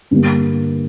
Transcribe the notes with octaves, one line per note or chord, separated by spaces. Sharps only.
G2 D3 G3 A#3